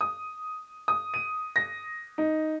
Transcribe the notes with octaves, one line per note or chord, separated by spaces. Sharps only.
D#6
D#6
D#7
A#6
D#4